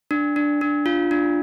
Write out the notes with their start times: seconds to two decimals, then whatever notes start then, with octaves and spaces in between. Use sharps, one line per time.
0.11 D4
0.36 D4
0.61 D4
0.86 F4
1.11 D4